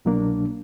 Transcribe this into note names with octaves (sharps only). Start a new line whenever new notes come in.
C2 B2 F#3 A#3 D4